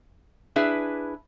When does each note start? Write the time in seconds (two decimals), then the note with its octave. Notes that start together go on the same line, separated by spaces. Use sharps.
0.56 D4 E4 G#4 B4 E5